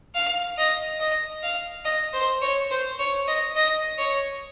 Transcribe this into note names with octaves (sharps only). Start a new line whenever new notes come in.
F5
D#5
D#5
F5
D#5
C5
C#5
C5
C#5
D#5
D#5
C#5